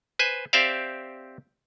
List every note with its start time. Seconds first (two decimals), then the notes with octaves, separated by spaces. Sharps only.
0.19 B4 C5 G#5
0.53 C4 G4 C5 D5 E5 F5